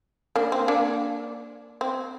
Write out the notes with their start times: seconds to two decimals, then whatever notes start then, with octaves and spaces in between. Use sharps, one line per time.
0.36 A#3 D4
0.52 C4
0.68 A#3 D4
1.81 C4